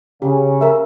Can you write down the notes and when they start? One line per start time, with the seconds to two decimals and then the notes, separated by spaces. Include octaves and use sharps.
0.22 C#3 G4
0.61 A#4 E5